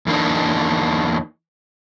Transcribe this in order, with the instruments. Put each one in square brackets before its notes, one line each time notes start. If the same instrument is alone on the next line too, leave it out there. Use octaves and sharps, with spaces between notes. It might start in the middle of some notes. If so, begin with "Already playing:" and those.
[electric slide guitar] E2 E3 A#3 D4 D#4